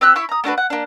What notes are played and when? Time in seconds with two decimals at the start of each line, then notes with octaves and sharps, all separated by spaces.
0.01 C4 G4 E6 F#6
0.16 E4 B5 C#6
0.29 A#5 D#6
0.44 A3 D4 F#4 B4
0.58 F#5
0.70 A#3 D4